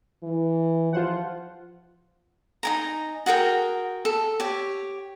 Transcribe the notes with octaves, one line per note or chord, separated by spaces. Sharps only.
E3
F3 F4 C5 F#5
D#4 G#5 A#5
F#4 G#4 A#4 G5
A4
G4 C#5